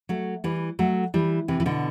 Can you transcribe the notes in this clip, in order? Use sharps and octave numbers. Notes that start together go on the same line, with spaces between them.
F#3 A3
E3 G3
F#3 A3
E3 G3
C3 E3
E3
B2 D3